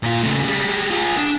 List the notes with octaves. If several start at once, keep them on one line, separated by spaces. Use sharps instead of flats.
A#2 F4
C#3 A3
G3 G#3
F4 G#4
D4